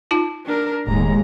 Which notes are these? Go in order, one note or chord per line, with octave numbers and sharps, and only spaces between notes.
D#4 F4 A5
D4 A#4
E1 D#2 A2 G#3 A#5